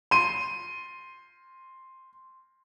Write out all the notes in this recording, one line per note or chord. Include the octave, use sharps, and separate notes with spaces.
C6 D#7